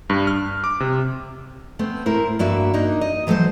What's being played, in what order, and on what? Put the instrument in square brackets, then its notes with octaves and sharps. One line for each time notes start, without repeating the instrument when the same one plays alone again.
[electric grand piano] G2
F6
D6
C3
[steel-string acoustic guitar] A3 B3 C4
A2 E4 A#4 C5
G2 A#3 F#4 E5
A#3 D4 D#4
D#5
E3 F#3 A3 A4 C5